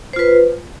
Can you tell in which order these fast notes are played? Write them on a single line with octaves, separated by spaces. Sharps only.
C5 F4 B4